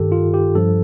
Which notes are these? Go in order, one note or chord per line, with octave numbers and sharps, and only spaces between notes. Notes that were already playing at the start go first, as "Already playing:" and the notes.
Already playing: G2 D#3 G4 A4
F4
G4
G2 F3 A4